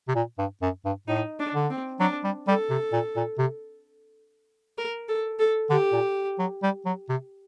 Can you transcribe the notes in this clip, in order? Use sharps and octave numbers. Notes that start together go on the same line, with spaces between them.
C3
A#2
G2
F#2
G2
A2 D#4
D4
D3
C4
F#3 D4
G3
G3 A4
C3
A#2
A#2
C3
A#4
A4
A4
D3 G4
A#2
F#3
G3
F#3
C3